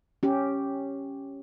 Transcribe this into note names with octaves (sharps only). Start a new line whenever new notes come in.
C#4 G4